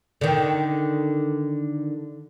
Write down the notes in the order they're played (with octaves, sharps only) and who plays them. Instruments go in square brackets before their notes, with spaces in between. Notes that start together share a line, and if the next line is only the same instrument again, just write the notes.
[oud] D3 D#3